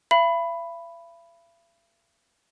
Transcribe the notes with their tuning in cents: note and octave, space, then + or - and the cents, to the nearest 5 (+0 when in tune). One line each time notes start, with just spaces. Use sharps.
E5 +45 B5 +0